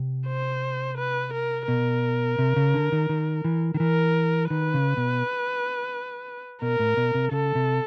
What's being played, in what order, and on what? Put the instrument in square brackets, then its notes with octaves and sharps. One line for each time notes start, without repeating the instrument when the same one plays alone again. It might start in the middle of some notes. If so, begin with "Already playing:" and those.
Already playing: [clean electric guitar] C3
[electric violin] C5
B4
A#4
[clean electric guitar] B2 [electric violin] A#4
[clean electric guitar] C3
C#3
D3
D#3
D#3
E3
D#3
[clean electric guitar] E3 [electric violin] A#4
[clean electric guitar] D#3 [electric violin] B4
[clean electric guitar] C#3
B2
[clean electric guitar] B2 [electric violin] A#4
[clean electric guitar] A2
B2
C3
[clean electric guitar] C#3 [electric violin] A4
[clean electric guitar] C3